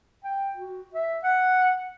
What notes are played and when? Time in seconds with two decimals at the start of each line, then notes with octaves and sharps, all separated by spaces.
0.24 G5
0.56 F#4
0.94 E5
1.23 F#5